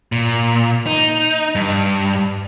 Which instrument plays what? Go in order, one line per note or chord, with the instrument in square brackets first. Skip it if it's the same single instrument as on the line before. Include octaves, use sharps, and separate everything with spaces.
[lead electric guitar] A#2
D#4
G2